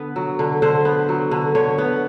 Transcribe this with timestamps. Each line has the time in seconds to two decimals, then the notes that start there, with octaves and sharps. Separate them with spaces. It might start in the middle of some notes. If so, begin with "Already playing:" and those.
Already playing: D3 B3 B4
0.16 F#3
0.39 D3
0.62 D3 C5
0.85 B3
1.09 F#3
1.31 D3
1.55 D3 C#5
1.78 B3